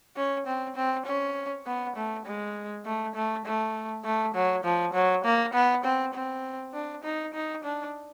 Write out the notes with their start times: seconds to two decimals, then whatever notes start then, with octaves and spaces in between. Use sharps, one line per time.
0.16 C#4
0.47 C4
0.76 C4
1.06 C#4
1.66 B3
1.96 A3
2.26 G#3
2.85 A3
3.15 A3
3.46 A3
4.04 A3
4.35 F#3
4.64 F3
4.94 F#3
5.25 A#3
5.54 B3
5.84 C4
6.14 C4
6.74 D4
7.04 D#4
7.34 D#4
7.64 D4